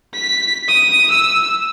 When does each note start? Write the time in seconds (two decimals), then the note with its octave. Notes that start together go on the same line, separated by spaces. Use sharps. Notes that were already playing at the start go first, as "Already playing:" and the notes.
0.14 B6
0.68 D#6
1.10 E6